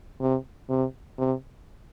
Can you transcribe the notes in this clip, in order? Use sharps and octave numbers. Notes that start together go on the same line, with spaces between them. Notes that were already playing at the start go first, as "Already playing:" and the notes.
C3
C3
C3